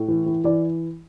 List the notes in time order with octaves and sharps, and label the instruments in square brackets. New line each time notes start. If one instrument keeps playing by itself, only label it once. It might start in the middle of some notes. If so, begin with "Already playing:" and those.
Already playing: [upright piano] A2
E3
E3
E3 D5